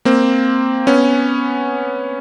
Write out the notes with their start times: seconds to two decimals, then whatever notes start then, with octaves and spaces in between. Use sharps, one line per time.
0.05 A#3 C4
0.87 B3 C#4